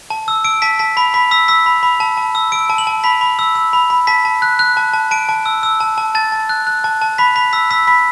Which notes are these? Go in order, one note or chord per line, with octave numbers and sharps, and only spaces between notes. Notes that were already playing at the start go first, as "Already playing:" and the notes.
A5
E6
E6 D7
A5 B6
A5 B6
B5 B6
B5 B6
E6 B6
E6 B6
B5
B5
A5
A5
E6
E6 D7
A5
F#7
A5
B5 B6
B5
E6
E6
B5
B5
A5 B6
A5
F#6
F#6
A5
A5
A5 D7
A5
E6
E6
A5
A5
A5 A6
A5
F#6
F#6
A5
A5
B5 B6
B5 B6
E6 B6
E6 B6
B5 B6